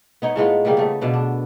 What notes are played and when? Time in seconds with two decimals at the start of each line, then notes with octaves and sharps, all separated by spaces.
0.22 B3 D#4 C#5
0.36 A2 G#3 B3 F4
0.65 C#3 G3 A#3 B3
0.77 C#3 A3
1.01 B2 D3 B3
1.13 D4